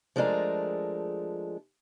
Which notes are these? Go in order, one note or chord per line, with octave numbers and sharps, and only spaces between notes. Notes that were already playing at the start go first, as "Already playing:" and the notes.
F3 G#3 A3 D4 G#4 A#4